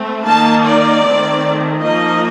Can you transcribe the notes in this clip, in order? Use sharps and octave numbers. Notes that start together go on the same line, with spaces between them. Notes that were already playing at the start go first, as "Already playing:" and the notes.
Already playing: A3 C4
D#3 A#3 D#4 A5
D5
D#3 A3 C4
F3 A#3 D#4 D#5